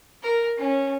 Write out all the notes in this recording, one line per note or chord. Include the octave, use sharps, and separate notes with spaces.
A#4
C#4